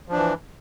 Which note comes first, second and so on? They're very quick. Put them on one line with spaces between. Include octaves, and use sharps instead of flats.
F3 D4 E3